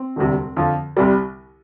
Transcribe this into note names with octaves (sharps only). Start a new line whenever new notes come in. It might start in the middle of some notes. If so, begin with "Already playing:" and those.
Already playing: C4
E1 D2 C3 G3
F2 D3 F3
C2 C3 G3